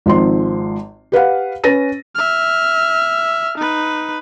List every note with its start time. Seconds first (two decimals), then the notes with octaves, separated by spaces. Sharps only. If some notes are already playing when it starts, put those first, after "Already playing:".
0.06 G#1 G#2 F3 C4 C6
1.12 G4 B4 F5 F#5
1.64 C#4 B4 A6 A#6 D#7
2.15 E5 F6
3.58 D#4 B4